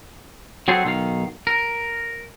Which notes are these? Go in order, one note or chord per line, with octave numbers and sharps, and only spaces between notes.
F#3 C4 F#4 G#4 A4 C5
B1 D#3 F5
A#4